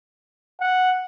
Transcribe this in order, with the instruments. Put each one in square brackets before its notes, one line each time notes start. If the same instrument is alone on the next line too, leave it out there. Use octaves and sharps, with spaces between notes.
[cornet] F#5